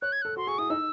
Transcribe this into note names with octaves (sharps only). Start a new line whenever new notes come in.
C#5 F#6
G#6
A4 F#6
F#4 C6
G#4 C#6
E4 D#6
D#4 E6